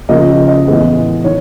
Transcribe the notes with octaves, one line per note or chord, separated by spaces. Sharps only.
C#3 F3 A#3 D#5
D#5
A2 E3 G#3 B3
D#3 C#5